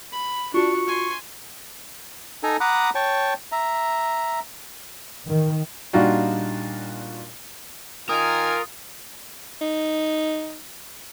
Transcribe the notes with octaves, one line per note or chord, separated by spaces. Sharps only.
B5
D4 F4 F#4 C#6
G#5 C6
D#4 A4 G#5 A#5
F#5 A#5 B5 D6 D#6 F#6
C#5 G5 A5 C#6
E5 A#5
D#3
A#2 G3 D4 D#4 F4 F#4
D#3 F4 A#4 G#5 D#6
D#4